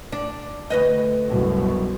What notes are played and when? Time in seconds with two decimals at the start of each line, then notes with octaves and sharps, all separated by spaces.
0.12 D4
0.70 D2 B4 D#5
1.28 C2 F#2 B2